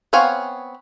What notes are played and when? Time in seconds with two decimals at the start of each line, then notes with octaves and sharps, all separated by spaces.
0.13 B3 C4 C#5 F5 G#5